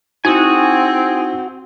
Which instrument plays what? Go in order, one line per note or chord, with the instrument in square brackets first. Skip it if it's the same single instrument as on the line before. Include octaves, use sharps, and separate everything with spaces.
[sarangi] C4 [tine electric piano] D#4 E4 [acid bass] F#4 [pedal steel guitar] G#4 G#5